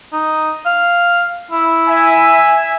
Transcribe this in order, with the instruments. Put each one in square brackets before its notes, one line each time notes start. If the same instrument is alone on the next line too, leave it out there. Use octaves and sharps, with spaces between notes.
[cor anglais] D#4
F5
E4
[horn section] E5 G#5